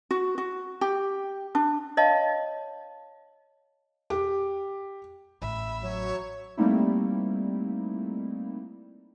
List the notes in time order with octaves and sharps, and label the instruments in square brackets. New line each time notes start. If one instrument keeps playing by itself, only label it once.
[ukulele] F#4
F#4
G4
D4
[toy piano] C#5 D#5 F5 A5
[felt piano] G4 D6
[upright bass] A1 [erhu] E5 [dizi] B5
[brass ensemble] F#3 [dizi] C#5
[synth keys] G3 A3 A#3 C4 D#4 E4